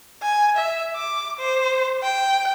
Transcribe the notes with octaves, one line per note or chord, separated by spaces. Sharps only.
G#5
E5
D6
C5
G5